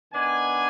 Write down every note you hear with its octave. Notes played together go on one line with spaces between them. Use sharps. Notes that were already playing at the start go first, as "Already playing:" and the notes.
D#3 B3 D4 G#5